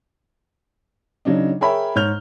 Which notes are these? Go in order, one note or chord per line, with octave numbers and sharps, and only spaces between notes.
C#3 F#3 D4 D#4
G#4 A#4 C#5 E5 G5 B5
G#2 C#5 F6 G6 F7